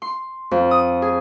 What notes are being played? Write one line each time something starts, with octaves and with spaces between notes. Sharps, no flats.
C6
F2
D#6
G#4